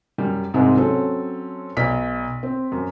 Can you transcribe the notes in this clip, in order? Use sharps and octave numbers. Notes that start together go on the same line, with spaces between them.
F#2 G3
C2 G#2 C3 G#3
F#3 C4 C#4 A4
B1 D5 B6
C4
F#2